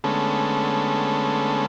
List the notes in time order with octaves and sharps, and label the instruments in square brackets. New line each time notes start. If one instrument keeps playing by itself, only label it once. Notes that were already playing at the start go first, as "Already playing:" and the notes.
[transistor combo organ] D3 G#3 A3 B3 C#4 A4